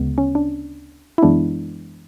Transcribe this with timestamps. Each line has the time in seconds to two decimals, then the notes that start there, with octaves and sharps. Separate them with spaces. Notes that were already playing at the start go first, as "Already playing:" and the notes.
Already playing: D2 C#3 G#3 B3
0.18 C#4
0.35 D4
1.18 E4
1.22 F#2 E3 G#3 B3 D4